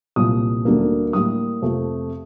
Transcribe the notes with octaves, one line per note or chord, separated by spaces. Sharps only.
C2 A#2 F3 D#6
D2 D3 G3 A#3
A2 G3 A#3 D#6
F2 C3 F3 A3